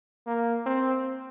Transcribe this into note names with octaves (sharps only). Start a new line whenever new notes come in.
A#3
C4